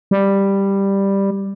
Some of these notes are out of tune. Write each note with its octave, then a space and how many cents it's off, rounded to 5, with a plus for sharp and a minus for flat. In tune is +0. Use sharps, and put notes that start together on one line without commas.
G3 +5